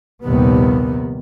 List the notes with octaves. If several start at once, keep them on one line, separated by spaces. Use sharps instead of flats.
A#1 D#2 C3 D#3 G3 B3